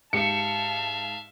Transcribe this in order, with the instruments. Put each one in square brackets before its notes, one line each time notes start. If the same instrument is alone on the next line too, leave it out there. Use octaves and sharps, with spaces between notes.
[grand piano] G#2 G4 [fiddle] E5 F5 [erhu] A5 [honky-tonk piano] C#7